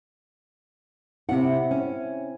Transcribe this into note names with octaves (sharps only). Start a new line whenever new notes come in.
C3 C4 E4 F#5
C#4